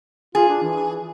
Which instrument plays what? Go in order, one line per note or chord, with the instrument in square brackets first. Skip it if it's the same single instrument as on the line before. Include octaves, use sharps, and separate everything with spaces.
[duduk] F4 [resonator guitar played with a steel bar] G#4
[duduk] D4
E3